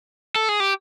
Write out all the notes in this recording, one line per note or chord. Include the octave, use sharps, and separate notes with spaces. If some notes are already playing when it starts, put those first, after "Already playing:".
A4
G#4
G4